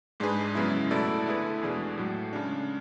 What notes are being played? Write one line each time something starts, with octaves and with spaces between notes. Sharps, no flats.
G#2 G#3 D4 G#4 B4
F#2 C#3 G#3 B3 E4
B2 A3 E4 A4 D5
D3 A3 E4 G#4 B4
E2 B2 G#3 D4 G#4
A2 F#3 A3
C#3 G#3 D4